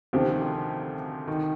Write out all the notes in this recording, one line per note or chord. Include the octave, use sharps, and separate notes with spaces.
D2 C3 D#3 F3 C4 G4
D#3